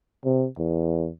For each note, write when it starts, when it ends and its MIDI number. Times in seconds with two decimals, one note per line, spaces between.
0.25 0.47 48
0.58 1.09 40